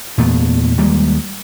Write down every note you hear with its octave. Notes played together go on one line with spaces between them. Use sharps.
E2 A#2 A3 B3
D#2 G3 G#3 A#3